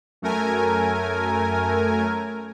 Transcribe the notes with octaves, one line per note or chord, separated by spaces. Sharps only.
F#2 A3 A#4 G#5